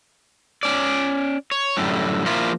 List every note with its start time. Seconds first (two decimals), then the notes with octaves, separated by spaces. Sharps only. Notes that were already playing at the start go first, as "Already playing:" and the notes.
0.63 C#4 D5
1.52 C#5
1.77 F#2 A2 D3 G3
2.26 F3 A#3 E4 F4